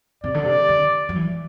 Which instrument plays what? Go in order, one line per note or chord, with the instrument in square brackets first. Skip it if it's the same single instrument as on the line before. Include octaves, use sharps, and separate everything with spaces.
[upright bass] C3 [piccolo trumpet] D5
[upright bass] D3
C3
D3
F#3
E3